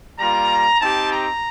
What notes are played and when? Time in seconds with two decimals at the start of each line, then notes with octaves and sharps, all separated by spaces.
0.19 G3 A#3 F4 A#5
0.80 C4 D#4 G4 A5
1.11 A#5